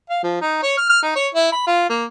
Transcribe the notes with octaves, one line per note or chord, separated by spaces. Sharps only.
F5
F3
D#4
C#5
F6
F6
D#4
C#5
E4
B5
F4
A#3